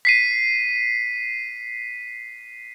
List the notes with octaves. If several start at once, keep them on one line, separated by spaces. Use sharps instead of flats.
B6 C7 D#7